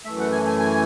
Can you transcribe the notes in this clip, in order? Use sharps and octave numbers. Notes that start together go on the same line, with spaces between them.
F#2 E3 A3 E5
F#5
G#5
G#5
G#5